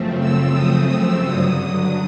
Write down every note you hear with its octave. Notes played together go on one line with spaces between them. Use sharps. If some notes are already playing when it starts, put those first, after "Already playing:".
Already playing: F#2 C#3 F3 A3 C4
E6
D#6
E6
G2 D3 F#3 D#6